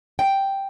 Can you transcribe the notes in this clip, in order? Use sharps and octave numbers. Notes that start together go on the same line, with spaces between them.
G5